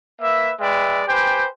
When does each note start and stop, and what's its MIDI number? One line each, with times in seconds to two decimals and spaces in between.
0.22 0.52 58
0.22 0.52 71
0.22 0.52 76
0.59 1.02 56
0.59 1.02 71
0.59 1.02 74
0.59 1.02 76
0.59 1.02 79
1.07 1.47 67
1.07 1.47 71
1.07 1.47 72
1.07 1.47 79
1.07 1.47 80